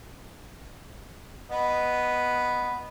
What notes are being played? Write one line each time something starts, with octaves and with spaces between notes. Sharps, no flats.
B3 B4 D#5